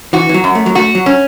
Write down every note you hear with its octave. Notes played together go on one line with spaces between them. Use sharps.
E3 F#4
E3
F#3
F#2
A3
F#3
A3 F#4
F#3
C#4